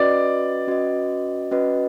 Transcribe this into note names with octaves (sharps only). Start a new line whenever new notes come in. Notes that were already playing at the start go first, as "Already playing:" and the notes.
Already playing: C#4 F#4 B4 D5 D#5
C#4 F#4 B4 D#5
C#4 F#4 B4 D#5